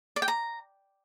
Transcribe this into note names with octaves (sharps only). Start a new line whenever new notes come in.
D5
G5
A#5